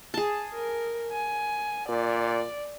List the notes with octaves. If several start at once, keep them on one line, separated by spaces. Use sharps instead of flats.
G#4 A5
A#4
G#5
A#2 D5